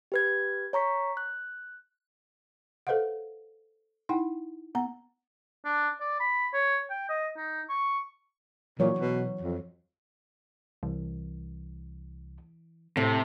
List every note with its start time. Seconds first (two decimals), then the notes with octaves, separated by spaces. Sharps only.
0.12 G4 B4 G#6
0.73 C#5 A#5 C#6 B6
1.17 F#6
2.87 A4 B4 C5 D#5 F5 F#5
4.09 D#4 E4 F#5 G5
4.75 B3 F#5 A#5
5.65 D4
6.00 D5
6.20 B5
6.53 C#5
6.90 G5
7.09 D#5
7.37 D#4
7.69 C#6
8.79 A#2 E3 F#3 C#5
8.99 B2
9.41 F2
10.83 C2 E3
12.97 A2 C3 A3